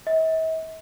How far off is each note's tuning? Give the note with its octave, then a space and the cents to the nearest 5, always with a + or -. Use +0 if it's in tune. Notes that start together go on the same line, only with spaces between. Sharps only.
E5 -45